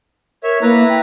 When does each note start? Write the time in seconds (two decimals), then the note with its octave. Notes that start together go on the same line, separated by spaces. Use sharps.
0.43 A#4 C#5 E5
0.62 A#3 E4 B4 A#5
0.89 G5